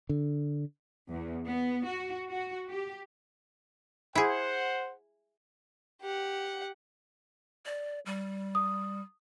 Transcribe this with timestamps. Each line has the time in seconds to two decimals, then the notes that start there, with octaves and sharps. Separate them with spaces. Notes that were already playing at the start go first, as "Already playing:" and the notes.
0.09 D3
1.10 E2
1.47 B3
1.87 F#4
2.30 F#4
2.69 G4
4.15 E4 G#4 C5 F#5
6.02 G4 F#5
7.66 D5
8.06 G3
8.55 D#6